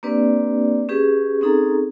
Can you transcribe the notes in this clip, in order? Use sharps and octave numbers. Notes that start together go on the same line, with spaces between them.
A#3 C4 D4 G4 B4 D5
C#4 G4 G#4 B4
C4 C#4 D#4 G#4 A4 A#5